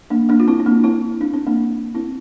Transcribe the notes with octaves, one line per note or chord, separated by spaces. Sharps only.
A#3 D4
A#3 D4
F4
C4 E4
C4
A#3 D4
C4 E4
D4
C4
A#3 D4
C4 E4